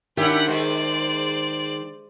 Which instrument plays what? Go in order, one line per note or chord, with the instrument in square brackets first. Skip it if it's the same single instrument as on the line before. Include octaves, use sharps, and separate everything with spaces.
[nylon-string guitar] D#3 [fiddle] C#4 F#5 [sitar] D4 E4 G4
[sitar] G#3 [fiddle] C5 D5